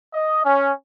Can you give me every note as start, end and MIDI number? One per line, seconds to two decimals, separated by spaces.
0.12 0.42 75
0.43 0.71 61